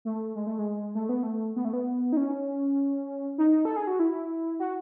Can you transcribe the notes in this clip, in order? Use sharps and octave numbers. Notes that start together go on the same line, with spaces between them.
A3
G#3
A3
G#3
A3
B3
A3
B3
A3
B3
D#4
C#4
D#4
A4
G#4
F#4
E4
F#4